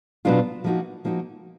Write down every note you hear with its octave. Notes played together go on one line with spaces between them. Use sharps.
B2 F#3 B3 D4 F4
F3 A#3 D#4 F#4
F3 A#3 D#4 F#4